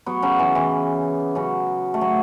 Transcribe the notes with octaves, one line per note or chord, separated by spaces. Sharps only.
F#3 B3
C#3 F#3
E3
E3
C#3 F#3
A3
F#3